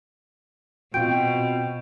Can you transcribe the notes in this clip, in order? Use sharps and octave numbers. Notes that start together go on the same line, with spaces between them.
B2 C4 F4 F#4 G5 G6 D7